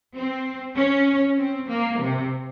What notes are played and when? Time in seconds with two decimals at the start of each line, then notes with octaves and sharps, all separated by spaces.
0.15 C4
0.75 C#4
1.37 C4
1.68 A#3
1.99 C3